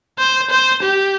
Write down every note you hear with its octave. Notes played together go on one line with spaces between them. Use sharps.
C5
C5
G4